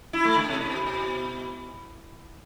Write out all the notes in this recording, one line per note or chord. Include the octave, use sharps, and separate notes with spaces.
E4
A3
D3
C3
C3
B2
B2